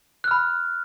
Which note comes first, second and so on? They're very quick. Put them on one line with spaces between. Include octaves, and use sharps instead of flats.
F#6 F6 B5